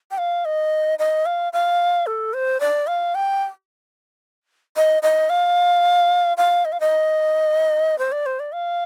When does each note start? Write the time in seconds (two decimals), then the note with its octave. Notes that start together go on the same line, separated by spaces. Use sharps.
0.11 G5
0.18 F5
0.45 D#5
0.99 D#5
1.26 F5
1.53 F5
2.06 A4
2.33 C5
2.60 D5
2.87 F5
3.15 G5
4.76 D#5
5.03 D#5
5.30 F5
6.37 F5
6.65 D#5
6.72 F5
6.80 D#5
7.99 C5
8.12 D5
8.26 C5
8.39 D5
8.54 F5